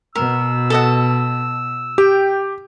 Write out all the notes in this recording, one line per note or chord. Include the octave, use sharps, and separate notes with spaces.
B2 A#4 E6
A4 D#5 F#5
G4 G5